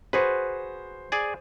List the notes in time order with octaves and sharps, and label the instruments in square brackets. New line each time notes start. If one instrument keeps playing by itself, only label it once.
[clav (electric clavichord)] F#4 G#4 B4 [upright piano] C5
[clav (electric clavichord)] G#4 D5 G#5